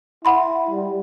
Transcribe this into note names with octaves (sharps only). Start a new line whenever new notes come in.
E4 F#5 B5 C6
G3